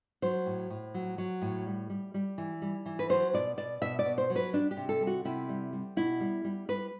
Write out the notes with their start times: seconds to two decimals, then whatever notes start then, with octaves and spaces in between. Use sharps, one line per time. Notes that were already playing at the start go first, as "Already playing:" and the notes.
0.22 F#3 C5
0.46 A2
0.70 A2
0.94 F#3
1.18 F#3
1.42 A2
1.66 G3
1.90 G3
2.14 G3
2.38 E3
2.62 G3
2.86 E3
2.99 B4
3.09 F#3 C5
3.34 B2 D5
3.58 B2 D5
3.81 B2 E5
3.99 D5
4.05 B2
4.18 C5
4.30 F#3
4.36 B4
4.53 G3 D4
4.71 G4
4.77 C3
4.89 A4
5.01 G3
5.07 F#4
5.25 C3 E4
5.49 G3
5.73 G3
5.96 B2 E4
6.20 G3
6.44 G3
6.68 G3 B4